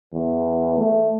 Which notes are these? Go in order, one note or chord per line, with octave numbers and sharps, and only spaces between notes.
E2
A3